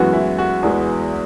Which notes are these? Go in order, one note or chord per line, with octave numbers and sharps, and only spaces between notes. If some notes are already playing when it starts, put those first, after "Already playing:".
Already playing: F#2 E3 G#3 B3 F#4
E4
F#4
E2 E3 G#3 B3